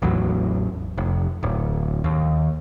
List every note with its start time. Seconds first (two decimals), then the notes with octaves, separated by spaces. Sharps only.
0.02 A1 E2 F#3
0.98 F1
1.43 D1
2.04 D#2